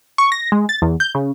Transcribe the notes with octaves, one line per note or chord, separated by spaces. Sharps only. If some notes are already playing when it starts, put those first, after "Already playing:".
C#6
A#6
G#3
A6
E2
G6
C#3